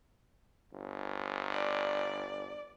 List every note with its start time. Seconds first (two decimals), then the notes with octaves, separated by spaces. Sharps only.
0.72 G1
1.51 D5